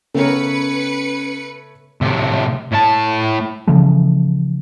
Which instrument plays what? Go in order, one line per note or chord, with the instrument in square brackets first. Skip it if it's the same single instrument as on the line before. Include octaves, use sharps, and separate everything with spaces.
[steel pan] C#3 B3 A#4 [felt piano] A3 C#5 [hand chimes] C#4 [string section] B4 C#7
[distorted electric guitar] A2 C3
A2 A5
[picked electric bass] C#3 E3 F3 A3